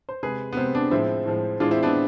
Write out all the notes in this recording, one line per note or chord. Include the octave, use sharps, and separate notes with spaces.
C5
C3 G#3 G#4 B4
B3
C3 G#3 C4
B3 D4
A2 F3 G#3 C4 E4
A2 F3 G#3
A2 E3 G#3 D4 F4
C4 E4
B3 D4